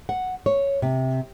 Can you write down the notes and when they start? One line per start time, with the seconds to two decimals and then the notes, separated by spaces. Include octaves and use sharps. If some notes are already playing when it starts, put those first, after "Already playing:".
0.09 F#5
0.46 C#5
0.82 C3